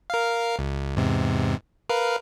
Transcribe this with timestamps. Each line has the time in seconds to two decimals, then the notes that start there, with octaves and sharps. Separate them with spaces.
0.10 A#4 F5
0.59 C#2
0.96 E2 G#2 C3
1.89 A#4 B4 F5